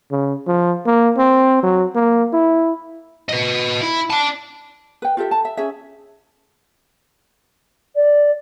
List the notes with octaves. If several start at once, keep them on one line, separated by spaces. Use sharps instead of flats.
C#3
F3
A#3
C4
F#3
A#3
E4
B4 D#5
E4
D5 A5
B4 G5
F4 G4 A4 E5
A5
E5
C#4 G#4 E5
D5